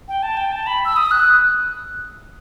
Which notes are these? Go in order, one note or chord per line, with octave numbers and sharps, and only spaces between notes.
G5
A5
G5
A5
B5
E6
D#6
F#6